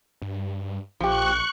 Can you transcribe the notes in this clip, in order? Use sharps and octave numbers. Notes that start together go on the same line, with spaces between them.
G2
A#1 F3 G4 C#6 F#6 C#7